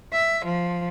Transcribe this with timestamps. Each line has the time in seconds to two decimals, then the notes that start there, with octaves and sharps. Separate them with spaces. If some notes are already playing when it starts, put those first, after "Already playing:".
0.13 E5
0.45 F3